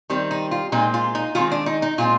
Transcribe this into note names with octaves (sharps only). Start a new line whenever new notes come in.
D#3 G3 C4
D#4
F4
A#2 G#3 C4 D#4
F4
D#4
D#3 G#3 C4 F4
D4
D#4
D#4
A#2 G#3 C4 F4